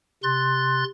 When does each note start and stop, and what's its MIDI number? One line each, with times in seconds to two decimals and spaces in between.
0.23 0.84 48
0.23 0.84 84
0.23 0.84 90
0.23 0.84 93